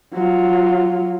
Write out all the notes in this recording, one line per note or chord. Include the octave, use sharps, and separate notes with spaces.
F#3 F4